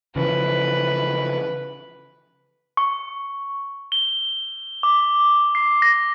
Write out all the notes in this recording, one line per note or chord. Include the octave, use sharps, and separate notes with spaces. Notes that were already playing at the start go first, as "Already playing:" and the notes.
C#3 E3 F3 B4
C#6
G7
D6
C7
A#6